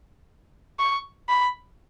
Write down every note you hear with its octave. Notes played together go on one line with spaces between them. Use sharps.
C#6
B5